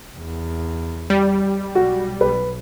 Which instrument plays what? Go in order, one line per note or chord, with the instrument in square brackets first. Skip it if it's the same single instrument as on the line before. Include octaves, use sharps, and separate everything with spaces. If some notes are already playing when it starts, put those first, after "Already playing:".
[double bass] E2
[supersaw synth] G3
[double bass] B1 [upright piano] F#4
[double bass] B1 [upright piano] B4